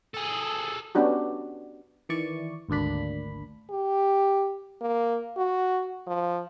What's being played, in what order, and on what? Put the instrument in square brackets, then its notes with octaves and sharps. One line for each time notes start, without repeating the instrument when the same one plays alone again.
[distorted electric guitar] G#4 A4
[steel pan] B3 C#4 D4 F#4 G4
[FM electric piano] D#3 E3 E4 D5 C#6
G#1 D2 A#3 D4 B5
[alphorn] G4
A#3
F#4
F3